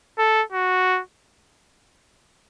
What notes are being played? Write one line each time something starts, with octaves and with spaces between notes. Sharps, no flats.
A4
F#4